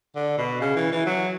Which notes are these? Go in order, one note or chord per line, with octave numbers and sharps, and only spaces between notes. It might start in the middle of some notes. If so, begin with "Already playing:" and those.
D3
B2
C#3
E3
E3
F#3